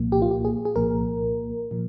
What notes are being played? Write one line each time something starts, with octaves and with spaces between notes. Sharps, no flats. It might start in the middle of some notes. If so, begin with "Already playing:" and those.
Already playing: C2 A#2 F3 A#3
G4
F4
G4
G#4
G#4
C2 A#2 F3 A#3 A#4
A#2 F3